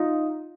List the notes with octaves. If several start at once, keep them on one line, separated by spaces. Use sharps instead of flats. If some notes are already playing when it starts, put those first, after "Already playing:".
Already playing: D#4 F4